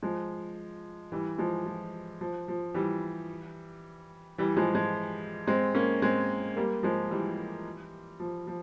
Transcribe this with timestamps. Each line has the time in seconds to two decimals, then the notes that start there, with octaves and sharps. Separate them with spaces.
0.03 F3 G#3
1.12 E3 G3
1.38 F3 G#3
1.66 F3
2.21 F3
2.48 F3
2.74 E3 G3
4.38 E3 G3
4.56 F3 G#3
4.75 F3 G#3
5.47 G#3 C4
5.75 A#3 C#4
6.02 G#3 C4
6.56 G3 A#3
6.83 F3 G#3
7.10 E3 G3
8.20 F3
8.47 F3